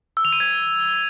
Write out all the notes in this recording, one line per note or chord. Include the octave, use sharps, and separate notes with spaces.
E6
F7
D#7
G#6